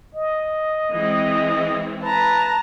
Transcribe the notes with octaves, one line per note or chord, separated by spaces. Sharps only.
D#5
E3 G#3 C4
B4 A5 A#5